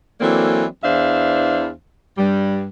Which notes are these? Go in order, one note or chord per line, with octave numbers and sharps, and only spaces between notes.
E3 F#3 A#3 C4 D4 A4
E2 E3 D4 C5 E5 F5
G2 G3